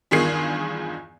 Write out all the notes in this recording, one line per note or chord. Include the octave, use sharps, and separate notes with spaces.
E2 G2 D#3 F4 G#4 C7